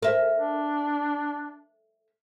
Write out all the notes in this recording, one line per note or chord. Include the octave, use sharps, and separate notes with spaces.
A#4 E5
D4